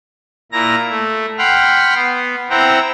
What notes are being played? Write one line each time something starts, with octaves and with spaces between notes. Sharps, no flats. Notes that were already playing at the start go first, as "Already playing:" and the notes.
A#2 E4 A#5 A#6
A3
F#5 G5 B5 C6 F6
B3
C4 E4 C5 F#5 G5 A#5